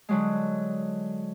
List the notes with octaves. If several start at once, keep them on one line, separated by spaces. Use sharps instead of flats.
D3 F#3 G#3